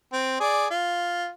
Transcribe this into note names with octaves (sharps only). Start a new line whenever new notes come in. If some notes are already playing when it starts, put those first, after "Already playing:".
C4
G#4 D5
F4